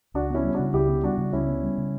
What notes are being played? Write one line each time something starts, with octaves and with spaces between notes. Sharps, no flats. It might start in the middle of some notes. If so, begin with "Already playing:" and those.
C#2 D4 F#4
B3 C#4 E4
G3
C#3 D4 F#4
C#2 E4 G4
B3
G3 D4 F#4
C#3
C#2 C#4 E4
B3
G3
C#3